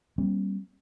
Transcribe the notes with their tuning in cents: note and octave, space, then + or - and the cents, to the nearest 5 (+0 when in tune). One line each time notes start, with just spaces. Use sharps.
G3 -5 A#3 +40 C#4 -40